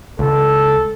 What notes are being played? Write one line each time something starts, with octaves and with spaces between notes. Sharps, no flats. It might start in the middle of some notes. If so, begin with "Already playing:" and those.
C#2 A4